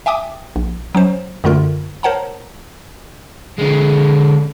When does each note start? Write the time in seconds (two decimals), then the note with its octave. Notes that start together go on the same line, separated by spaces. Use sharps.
0.06 E5 G5 G#5 D6 D#6
0.56 A#1
0.95 F#3 C#4 C5
1.44 F#2 D3 A3 F4 A#4
2.03 A#4 C5 C#5 F#5 A5 A#5
3.58 D3 G#3